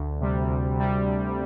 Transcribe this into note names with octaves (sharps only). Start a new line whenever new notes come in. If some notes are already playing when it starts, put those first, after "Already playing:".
Already playing: D2
C3 G3
D2
C3 G3
D2